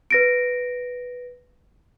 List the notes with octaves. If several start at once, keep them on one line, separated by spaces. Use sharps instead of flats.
B4 A#6 D7